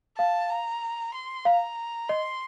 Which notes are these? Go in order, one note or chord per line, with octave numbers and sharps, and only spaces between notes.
F5 A5
A#5
C6
F5 A#5
D#5 C6